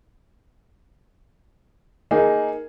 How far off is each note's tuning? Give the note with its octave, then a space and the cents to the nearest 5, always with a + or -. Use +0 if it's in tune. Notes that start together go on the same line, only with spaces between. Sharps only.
A#3 -5 D#4 +0 G#4 +0